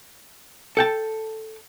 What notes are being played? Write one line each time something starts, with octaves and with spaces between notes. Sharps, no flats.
A4 G5 A5